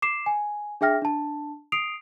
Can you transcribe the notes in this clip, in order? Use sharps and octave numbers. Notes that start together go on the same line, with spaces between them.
D6 C7 E7
G#5
D4 G#4 E5 G5 F6 A#6
D4 A5
D#6 C7 D7 F7